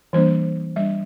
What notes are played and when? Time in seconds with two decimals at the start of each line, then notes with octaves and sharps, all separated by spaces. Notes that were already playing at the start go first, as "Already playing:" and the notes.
0.13 E3 G3 A#3 D4 C5
0.76 G3 D4 E5